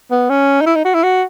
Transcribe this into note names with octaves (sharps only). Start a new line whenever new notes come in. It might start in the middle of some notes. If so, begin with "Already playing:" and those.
B3
C#4
D#4
E4
D#4
F#4
E4
F#4